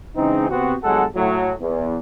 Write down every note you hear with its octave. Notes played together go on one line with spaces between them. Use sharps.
C#3 E3 G#3 C4 D#4
C3 B3 C4 F#4
G1 F#3 G#3 A4 F#5
A2 F#3
E2